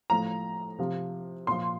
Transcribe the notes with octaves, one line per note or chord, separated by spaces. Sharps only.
A2 F3 A#5
C3 F3
A#2 F3 C6